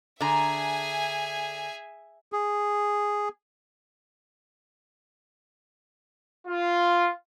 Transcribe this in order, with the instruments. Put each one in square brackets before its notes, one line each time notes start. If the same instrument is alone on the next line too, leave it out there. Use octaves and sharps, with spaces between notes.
[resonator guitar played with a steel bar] D3 A#5 [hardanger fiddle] G#4 [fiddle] E5 G#5
[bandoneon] G#4
[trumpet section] F4